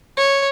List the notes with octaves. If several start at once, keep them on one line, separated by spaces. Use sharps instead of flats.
C#5